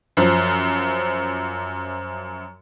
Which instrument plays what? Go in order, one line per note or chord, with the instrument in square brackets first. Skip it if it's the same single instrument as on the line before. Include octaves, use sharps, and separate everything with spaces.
[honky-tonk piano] F#2 F3